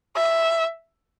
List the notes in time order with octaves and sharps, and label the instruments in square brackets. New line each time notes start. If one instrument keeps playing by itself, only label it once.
[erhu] E5